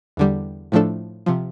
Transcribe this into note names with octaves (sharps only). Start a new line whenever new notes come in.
E2 D3 G3
A2 F3 A3 D4 A4
C3 F3